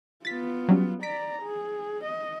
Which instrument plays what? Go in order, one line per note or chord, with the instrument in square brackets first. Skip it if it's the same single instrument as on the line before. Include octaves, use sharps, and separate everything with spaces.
[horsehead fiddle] B3 F4 [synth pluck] A6 B6
[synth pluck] F#3 G3 C#4
[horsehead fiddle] D5 A#5 [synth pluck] B6 D7
[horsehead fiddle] G#4
D#5